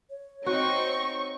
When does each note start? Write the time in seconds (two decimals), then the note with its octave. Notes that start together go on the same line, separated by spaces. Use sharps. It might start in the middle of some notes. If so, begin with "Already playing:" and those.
0.10 C#5
0.46 C4 D#4 F#4 C#6